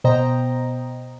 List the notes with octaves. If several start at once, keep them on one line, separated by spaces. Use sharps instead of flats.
B2 C5 D#5 G5 A#5